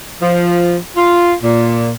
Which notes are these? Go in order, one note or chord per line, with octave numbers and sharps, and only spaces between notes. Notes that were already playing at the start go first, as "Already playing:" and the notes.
F3
F4
A#2